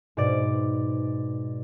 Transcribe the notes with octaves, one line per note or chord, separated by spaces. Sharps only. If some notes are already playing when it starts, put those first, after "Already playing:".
G#2 B2 D5